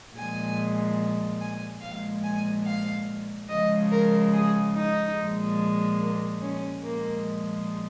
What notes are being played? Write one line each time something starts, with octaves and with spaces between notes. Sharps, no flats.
A#2 F3 G#3 G#5
G#5
A#2 F3 G#3 F5
G#5
F5
C#3 F3 G#3 D#5
A#4
G#4
D#4
A#2 F3 G#3
A#3
C#4
A#2 F3 G#3 A#3